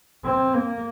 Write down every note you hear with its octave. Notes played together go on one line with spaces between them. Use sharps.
C4
A#3